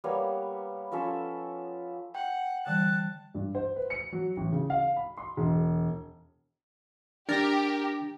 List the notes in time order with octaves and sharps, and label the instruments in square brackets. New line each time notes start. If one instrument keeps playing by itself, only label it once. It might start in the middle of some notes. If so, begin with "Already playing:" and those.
[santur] G3 A#3 B3 C#5
F3 C#4 A4 E5
[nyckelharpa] F#5 [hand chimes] G5
[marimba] D3 E3 G3 [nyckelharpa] A5 [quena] F#6
[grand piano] G2
C5
B4
C#7
F#3
A1
C#3
F5
B5
C6
E1
[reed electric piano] D4 A6 [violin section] G4 [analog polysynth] A#4